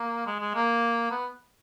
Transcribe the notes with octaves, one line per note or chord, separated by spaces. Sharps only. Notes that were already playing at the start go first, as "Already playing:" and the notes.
Already playing: A#3
G#3
G#3
A#3
B3